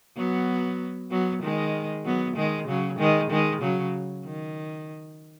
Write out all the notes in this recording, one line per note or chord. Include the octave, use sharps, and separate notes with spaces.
F#3 B3
F#3 B3
D#3 G#3
F#3 B3
D#3 G#3
C#3 F#3
D#3 G#3
D#3 G#3
C#3 F#3
D#3